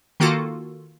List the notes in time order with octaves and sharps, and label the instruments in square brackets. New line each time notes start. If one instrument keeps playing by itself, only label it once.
[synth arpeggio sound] D#3 A#3 F4 F#4 A4